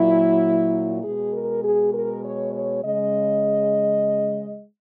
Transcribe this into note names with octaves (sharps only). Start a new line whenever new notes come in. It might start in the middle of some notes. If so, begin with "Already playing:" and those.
Already playing: A#2 F#3 E4
B2 G#3 G#4
A#4
G#4
A#4
C#5
C#5
C#3 G#3 D#5